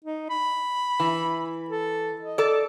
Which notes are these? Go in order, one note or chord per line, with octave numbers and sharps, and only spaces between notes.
D#4
B5
E3
A4
D#5
A4 D5